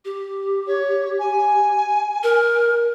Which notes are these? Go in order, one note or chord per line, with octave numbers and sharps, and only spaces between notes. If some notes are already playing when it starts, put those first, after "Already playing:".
G4
C#5
G#5
A#4